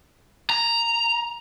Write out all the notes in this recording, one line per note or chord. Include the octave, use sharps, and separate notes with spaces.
A#5